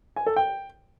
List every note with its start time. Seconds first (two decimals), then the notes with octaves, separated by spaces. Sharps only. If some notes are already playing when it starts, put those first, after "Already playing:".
0.16 G#5
0.26 A4
0.36 G5